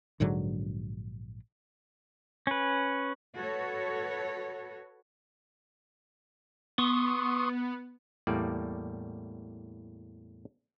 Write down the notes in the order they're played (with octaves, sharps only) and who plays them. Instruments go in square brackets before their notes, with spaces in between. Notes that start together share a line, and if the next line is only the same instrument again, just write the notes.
[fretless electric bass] A#1 G#2 D3 F#3
[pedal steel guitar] C#4 B4
[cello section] F#4 A4 B4 C#5
[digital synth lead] B3 [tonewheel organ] C6 C#6 D#6
[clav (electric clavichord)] E2 A2 G3 A#3 D5